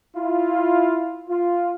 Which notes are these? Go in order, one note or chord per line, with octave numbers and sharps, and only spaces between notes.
E4 F4
F4